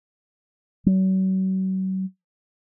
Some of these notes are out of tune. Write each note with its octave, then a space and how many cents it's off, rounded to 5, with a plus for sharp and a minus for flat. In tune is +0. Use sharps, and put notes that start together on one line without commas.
F#3 +40